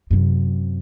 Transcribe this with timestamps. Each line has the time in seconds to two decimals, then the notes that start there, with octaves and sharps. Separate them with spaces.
0.11 F#2 C3